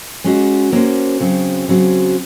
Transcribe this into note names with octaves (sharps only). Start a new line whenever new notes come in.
G#3 C#4 F#4
A#3 C#4 F#4 C5
C#3 F#3 C4
C#3 F#3 C4 F#4